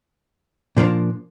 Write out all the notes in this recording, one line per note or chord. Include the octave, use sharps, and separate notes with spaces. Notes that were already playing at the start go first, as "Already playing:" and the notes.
A#2 F3 A#3 D4